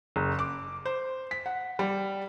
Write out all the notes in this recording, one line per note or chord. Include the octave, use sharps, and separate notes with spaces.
F#1
D6
C5
B6
F#5
G3